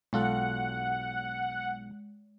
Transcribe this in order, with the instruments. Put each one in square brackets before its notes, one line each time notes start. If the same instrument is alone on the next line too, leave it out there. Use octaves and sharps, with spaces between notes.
[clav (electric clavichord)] B1 F4 A4 [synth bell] G#3 [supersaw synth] F#5